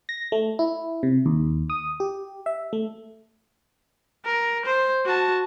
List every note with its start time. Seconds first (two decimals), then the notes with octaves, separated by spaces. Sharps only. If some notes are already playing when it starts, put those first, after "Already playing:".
0.09 A#6
0.32 A3
0.59 E4
1.03 C3
1.26 D#2
1.70 D#6
2.00 G4
2.46 E5
2.73 A3
4.25 A#4
4.65 C5
5.05 F#4 A5